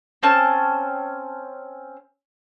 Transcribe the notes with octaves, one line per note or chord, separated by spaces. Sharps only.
C4 C#4 A5